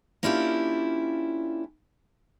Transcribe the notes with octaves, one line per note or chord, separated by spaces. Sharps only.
A#3 C#4 D4 E4 F4 G4